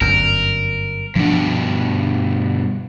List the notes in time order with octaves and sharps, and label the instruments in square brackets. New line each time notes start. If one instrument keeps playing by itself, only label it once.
[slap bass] G1 F#2 [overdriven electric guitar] A#4
[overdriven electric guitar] G2 B2 [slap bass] F3 D4